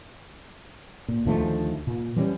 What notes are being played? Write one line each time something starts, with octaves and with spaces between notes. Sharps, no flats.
A#2
D2 D#3 F3 A3
A#2
E3 G3 A#3 C#4